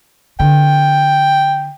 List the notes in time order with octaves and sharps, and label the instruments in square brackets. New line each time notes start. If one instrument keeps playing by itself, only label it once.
[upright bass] D3 [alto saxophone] G5